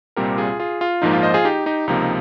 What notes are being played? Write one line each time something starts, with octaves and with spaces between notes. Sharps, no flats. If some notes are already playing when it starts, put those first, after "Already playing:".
C2 A#2 G3 C4 G4 A#4
F4 G#4
F4 G#4
F4
A#1 G#2 F3 A#3 D#4
F4
C5 D#5
F4 G#4
D#4 G4
D#4 G4
C#2 C3 F3 A#3 D#4